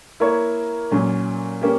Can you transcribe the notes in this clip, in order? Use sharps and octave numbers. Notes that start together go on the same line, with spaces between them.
A#3 E4 A#4 C#5
A#2 F#3 C#4
A#3 C#4 G4